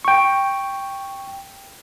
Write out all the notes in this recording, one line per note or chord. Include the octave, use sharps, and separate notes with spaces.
G5 C#6